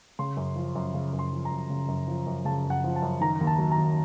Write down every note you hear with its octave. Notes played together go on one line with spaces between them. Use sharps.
C#3 C6
F#2
F3
F#2
C#3
F#2
C6
F3
A#5
F#2
C#3
F#2
F3
F#2
C#3 A5
F#2
F#5
F3
A5
F#2
D#3 A#5
D#2
A5
F#3
A#5
D#2